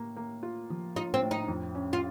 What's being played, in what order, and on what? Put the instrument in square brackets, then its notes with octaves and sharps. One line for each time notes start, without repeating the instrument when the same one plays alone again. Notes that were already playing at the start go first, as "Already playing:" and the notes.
Already playing: [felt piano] A2 A#3
A#3
F4
F3
[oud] D#4 [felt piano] F4
[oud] C4
[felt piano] A2
[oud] D#4
[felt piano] F2
C#4
[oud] F4